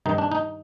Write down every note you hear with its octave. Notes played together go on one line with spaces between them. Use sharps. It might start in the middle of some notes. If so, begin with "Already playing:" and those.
G2 D#3 D#4
D4
D#4